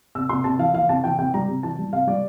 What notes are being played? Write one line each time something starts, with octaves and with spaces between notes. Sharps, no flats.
C3 E6
C3 C6
C3 A5
E3 F5
E3 F5
C3 A5
E3 G5
C3 G5
G3 A#5
C3
E3 A5
G3
C3 F5
G3 D5